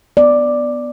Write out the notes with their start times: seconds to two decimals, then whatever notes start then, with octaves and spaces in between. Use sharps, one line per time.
0.17 B3 D5